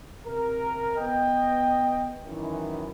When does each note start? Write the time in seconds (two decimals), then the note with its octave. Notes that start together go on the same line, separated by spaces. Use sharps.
0.26 C3 A#4
0.97 B3 D#5 G5
2.24 F#2 D#3 E3